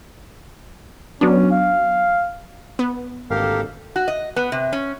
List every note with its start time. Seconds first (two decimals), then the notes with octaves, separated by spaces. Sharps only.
1.21 F#3 B3 C#4 D4
1.51 F5
2.79 B3
3.31 G#1 D2 A#3 G4 A4 A#4 F5
3.96 F#4
4.08 D#5
4.36 B3
4.52 C3
4.73 C#4